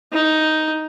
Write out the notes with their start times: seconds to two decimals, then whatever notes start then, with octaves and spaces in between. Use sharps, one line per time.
0.13 D#4